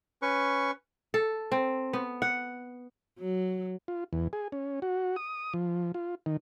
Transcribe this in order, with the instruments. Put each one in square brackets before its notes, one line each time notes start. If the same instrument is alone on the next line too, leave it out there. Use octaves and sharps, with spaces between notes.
[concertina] C#4 B4 C#6
[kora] A4
C4
B3
F#5
[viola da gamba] F#3
[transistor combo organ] F4
E2
G#4
C#4
F#4
D#6
F3
F4
D#3